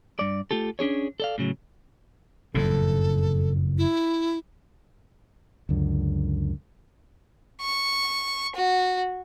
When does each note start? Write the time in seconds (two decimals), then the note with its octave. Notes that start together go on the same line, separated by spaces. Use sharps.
0.19 G2 D5
0.51 A3 F4 G4 A4
0.79 C#4 D4 G#4 C#5
1.20 A4 D5 F5
1.38 A2 C#3 F#3
2.55 F#1 F2 A2 A4
3.78 E4
5.69 C#2 F#2 D3
7.61 C#6
8.56 F#4